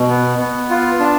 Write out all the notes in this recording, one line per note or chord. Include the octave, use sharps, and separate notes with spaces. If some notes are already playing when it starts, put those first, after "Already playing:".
Already playing: B2
B3
B3
F4
D4